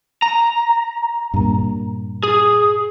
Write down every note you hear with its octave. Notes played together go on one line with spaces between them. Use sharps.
A#5
G2 A#2
G#4